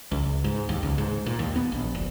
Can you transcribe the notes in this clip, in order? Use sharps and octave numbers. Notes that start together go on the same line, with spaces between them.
C#2
G#2
D#2
C#2
G#2
A#2
D#2
B3
A#1
F1